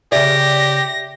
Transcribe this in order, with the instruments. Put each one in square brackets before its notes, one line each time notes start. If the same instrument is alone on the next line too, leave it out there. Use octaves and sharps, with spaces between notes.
[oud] C#3 D5 [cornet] G4 [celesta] E5 [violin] A#6